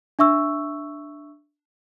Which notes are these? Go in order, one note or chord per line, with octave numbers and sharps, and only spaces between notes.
D4 E5 C#6 E6